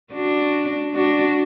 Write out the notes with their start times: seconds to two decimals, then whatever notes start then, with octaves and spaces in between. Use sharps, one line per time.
0.13 D4 F#4
0.95 D4 F#4